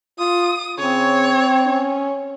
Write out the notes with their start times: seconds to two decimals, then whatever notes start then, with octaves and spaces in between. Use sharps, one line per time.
0.19 F4 D#6
0.79 C#3 C4 C#5
1.66 C#4